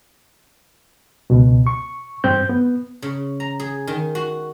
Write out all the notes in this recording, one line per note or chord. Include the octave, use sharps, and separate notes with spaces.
C#2 B2
C#6
G2 C4 G6
B3
C#3
A#5
G#4
D#3
F#4